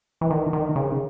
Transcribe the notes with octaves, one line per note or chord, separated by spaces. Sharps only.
E3
D#3
D#3
C#3